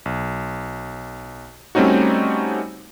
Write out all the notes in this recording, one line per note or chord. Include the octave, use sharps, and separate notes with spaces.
B1
G3 A3 C4 C#4 D#4 F#4